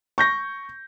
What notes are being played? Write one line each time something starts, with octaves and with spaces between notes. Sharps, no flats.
C#6 G6 A#6